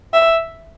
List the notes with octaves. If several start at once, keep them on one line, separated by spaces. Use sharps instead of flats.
E5